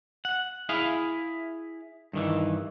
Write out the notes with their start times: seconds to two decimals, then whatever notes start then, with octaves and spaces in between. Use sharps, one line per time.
0.25 F#5
0.69 E4 G#4 F5
2.13 G2 D#3 E3